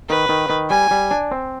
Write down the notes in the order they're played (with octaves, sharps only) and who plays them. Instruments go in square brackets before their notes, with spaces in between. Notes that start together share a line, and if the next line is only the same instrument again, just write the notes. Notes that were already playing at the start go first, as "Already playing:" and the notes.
[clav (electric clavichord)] D#3 [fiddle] B4
[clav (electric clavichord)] D#3
D#3
[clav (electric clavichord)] G3 [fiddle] G#5
[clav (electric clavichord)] G3
D4
C4